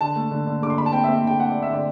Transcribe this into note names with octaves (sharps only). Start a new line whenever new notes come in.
D3 A5
A3
D3
D3
D3 D6
C6
D3 B5
A5
C4 G5
E5
C4
E5
D3 G5
C4 F#5
D5
A3
E5
D3 D5